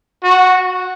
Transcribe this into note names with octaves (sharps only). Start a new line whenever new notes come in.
F#4